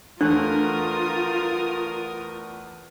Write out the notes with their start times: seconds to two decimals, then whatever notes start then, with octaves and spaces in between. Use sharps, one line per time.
0.21 E2 A3 D4 F4 A#4 D#6 F#6